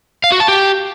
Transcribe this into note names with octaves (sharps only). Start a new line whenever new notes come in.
F5
F#4
A5
G4